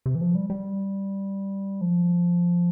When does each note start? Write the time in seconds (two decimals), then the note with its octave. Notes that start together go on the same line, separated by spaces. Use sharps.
0.06 C3
0.15 E3
0.21 F3
0.35 G3
0.50 G3
1.81 F3